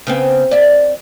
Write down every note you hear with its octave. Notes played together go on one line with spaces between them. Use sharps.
C#3 B3 C4
D5 E5